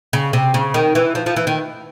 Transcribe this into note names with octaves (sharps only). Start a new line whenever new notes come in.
C#3
C3
C#3
D#3
E3
F3
F3
E3
D#3